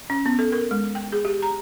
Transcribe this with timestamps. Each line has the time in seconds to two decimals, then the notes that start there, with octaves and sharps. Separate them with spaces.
0.10 C#4
0.26 B3
0.39 A4
0.52 A#4
0.71 G#3
0.95 G5
1.12 G#4
1.25 G4
1.42 A#5